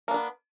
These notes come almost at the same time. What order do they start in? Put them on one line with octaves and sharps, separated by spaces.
A#3 D4 B3